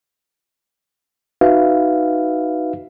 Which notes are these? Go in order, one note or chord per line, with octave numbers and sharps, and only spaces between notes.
D#4 F#4 B4 E5 F5